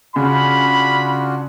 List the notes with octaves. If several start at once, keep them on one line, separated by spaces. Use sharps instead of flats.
C#3 D4 F4 F#4 B5